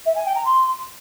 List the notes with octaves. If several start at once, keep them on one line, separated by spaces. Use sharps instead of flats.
E5
G#5
G5
A#5
C6